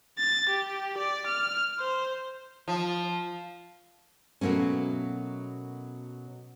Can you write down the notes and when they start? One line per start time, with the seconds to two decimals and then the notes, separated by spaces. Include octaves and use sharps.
0.18 A6
0.50 G4
0.98 D5
1.27 F6
1.79 C5
2.68 F3
4.41 B2 F#3 A3 A#3 C#4